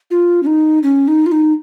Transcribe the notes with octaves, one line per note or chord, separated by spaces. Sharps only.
F4
C#4
D#4
C#4
D#4
F4
D#4